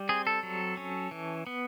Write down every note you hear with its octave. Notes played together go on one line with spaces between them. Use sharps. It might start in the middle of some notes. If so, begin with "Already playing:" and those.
Already playing: G3
C4 G#4
A4
F#3
C#4
E3
B3